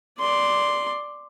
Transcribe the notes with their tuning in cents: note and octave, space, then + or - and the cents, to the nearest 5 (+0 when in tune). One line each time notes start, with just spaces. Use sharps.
D5 +0 C6 +0